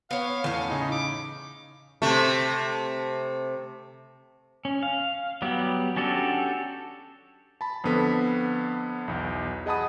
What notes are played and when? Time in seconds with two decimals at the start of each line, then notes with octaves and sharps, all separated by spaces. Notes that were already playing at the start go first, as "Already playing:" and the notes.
0.11 B3 B4 C#5 F5
0.44 E2 A2 C#4
0.70 C#3 D#4
0.92 D6
2.02 C3 A3
4.65 C#4
4.83 F5
5.42 F#3 G3 B3 G4
5.96 C#4 D4 F#4 G4 A4
7.61 A5 B5
7.84 F2 D3 B3 A4 B6
9.08 B1 E2
9.66 G#4 D#5 F#5 A5 B5 D#6